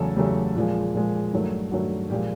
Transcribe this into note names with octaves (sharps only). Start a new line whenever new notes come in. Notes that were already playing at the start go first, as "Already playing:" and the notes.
Already playing: E2 C#3 F#3 A3 A4
E2 C#3 F#3 A3 G4
A#2 F3 G#3
A#2 F3 G#3
G2 D#3 F#3 A3
G2 D#3 F#3 A3 F#4
A#2 F3 G#3 G4